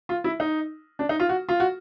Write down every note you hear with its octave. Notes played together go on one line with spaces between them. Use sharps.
F4
E4
D#4
D4
D#4
F4
F#4
F4
F#4